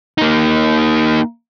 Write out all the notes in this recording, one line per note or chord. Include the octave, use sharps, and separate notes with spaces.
A#3 D#4